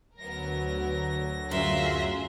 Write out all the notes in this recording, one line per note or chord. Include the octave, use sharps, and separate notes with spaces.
D2 F#3 B3 A#4 A#6
F#2 F4 G#4 A#4 E5 C6